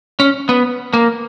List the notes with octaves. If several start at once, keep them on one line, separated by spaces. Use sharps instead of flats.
C#4
B3
A#3